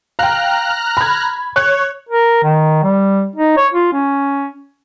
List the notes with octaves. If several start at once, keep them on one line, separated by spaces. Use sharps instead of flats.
F5 G5 A#5 F6 F#6
B5 G#6
C#5 F#6
A#4
D#3
G3
D#4
C#5
F4
C#4